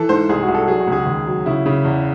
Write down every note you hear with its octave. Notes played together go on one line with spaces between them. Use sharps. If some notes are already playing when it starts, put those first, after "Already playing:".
Already playing: E3 A4
G#2 C5
C2 G#4
F#4
C2
A4
F#3 G#4
F#4
C#2 G#4
D#2
F#3
C#3 E4
C#3
E2